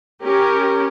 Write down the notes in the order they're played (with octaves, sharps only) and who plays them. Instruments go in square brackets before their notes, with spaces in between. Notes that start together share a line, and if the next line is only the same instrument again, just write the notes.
[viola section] C#4 G4 A#4